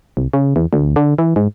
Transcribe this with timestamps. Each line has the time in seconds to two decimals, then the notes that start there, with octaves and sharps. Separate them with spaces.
0.17 C2
0.33 C#3
0.56 E2
0.73 D2
0.96 D3
1.18 E3
1.36 G#2